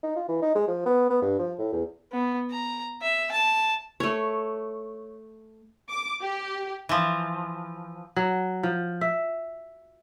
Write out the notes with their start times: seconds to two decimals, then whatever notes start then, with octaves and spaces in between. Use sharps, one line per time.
0.03 D#4
0.16 F4
0.29 E3
0.42 D#4
0.55 G#3
0.68 F3
0.86 B3
1.10 B3
1.22 G2
1.39 F3
1.59 A2
1.73 E2
2.12 B3
2.51 A#5
3.02 E5
3.32 A5
4.00 A3 C#5
5.89 D6
6.22 G4
6.89 E3 F3
8.16 F#3
8.63 F3
9.01 E5